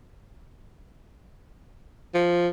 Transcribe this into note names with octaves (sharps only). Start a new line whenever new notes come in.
F3